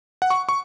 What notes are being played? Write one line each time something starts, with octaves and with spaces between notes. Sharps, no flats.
F#5
C#6
C#6